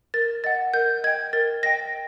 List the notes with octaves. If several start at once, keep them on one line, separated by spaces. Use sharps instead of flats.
A#4 A6
D#5 F#5 A6
A#4 G6
D#5 G5 G#6
A#4 A6
D#5 G5 A#6